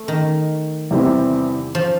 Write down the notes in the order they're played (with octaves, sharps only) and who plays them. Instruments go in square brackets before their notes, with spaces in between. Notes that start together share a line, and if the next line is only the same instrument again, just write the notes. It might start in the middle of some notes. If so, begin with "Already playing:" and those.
Already playing: [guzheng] A3
D#3
[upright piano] E2 C3 E3 G3 C4
[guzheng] F3